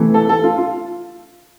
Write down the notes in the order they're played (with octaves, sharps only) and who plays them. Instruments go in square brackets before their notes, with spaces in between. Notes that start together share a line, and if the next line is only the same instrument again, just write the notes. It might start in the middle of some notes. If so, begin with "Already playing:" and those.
Already playing: [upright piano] C3 E3 A3
A4
A4
F4
F4